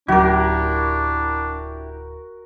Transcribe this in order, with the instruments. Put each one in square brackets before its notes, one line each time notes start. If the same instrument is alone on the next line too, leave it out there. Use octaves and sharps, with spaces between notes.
[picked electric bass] D1 F#3 C#4 [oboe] D4 [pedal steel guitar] E4 G4 [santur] F#4 A#4